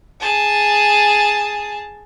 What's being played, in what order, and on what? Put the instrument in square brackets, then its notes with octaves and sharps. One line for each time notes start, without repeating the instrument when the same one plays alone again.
[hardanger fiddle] G#4 A5